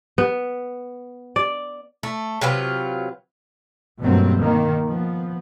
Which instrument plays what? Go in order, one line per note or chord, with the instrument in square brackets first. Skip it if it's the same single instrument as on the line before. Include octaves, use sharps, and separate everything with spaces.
[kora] B3
D5
[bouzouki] A3
C3 F#3 F4 B4
[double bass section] G2 B2 F#3 A3 A#3 C4
D#3 A#3
F3 B3